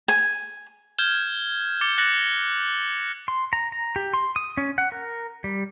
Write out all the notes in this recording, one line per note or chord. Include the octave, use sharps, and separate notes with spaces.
G#5
F6 G6 G#6 E7 G7
D6 A6 C#7 G7
F#6 A6 A#6 C#7 F#7
C6
A#5
A#5
G4
C6
D#6
C#4
F#5
A#4
G3